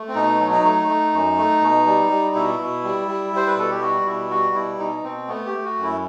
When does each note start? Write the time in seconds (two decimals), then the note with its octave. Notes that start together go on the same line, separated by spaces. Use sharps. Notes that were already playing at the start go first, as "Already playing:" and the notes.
Already playing: A3
0.08 C4
0.15 B2 D#4
0.40 F#3
0.52 D#4
0.64 A3
0.88 A3
1.13 F#2
1.38 A3
1.62 B2
1.86 G3
2.10 G3
2.35 B2 E4
2.60 B2
2.84 G3
3.08 G3
3.33 G3 C5
3.47 B4
3.57 B2 A4
3.70 G4
3.81 G3 F#4
4.06 B2 E4
4.30 G3 F#4
4.55 B2 E4
4.79 B2 D#4
5.04 B2 C4
5.28 A3 B3
5.46 G4
5.53 A3
5.65 F#4
5.77 F#2
5.83 E4